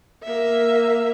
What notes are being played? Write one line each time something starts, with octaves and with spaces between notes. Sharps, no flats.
A#3 E5